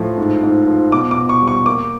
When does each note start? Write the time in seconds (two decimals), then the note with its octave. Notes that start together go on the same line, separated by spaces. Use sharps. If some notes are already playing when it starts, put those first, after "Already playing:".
Already playing: A2 F3
0.18 G#2
0.43 G#2
0.68 F3
0.92 B2 D6
1.11 D6
1.16 B2
1.29 C#6
1.42 G3
1.48 C#6
1.66 A#3 D6